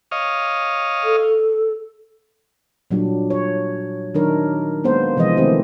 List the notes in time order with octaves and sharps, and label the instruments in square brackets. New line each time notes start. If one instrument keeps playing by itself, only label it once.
[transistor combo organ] C#5 D#5 F5
[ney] A4
[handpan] A#2 F#3 G3 D4
C#5
D#3 F#3 D4 D#4 A#4 C#5
G#3 A#3 B3 C5
C3 E3 F3 G#3 D#5
D#3 A3 C4 G4